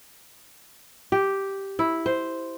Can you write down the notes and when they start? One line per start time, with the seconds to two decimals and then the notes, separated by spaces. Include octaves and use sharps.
1.12 G4
1.79 E4
2.06 C5